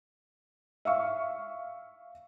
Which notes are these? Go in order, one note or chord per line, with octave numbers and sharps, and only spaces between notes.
E5 F5 C#6